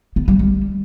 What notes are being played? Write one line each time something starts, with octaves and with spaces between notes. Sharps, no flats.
B3
G3
G3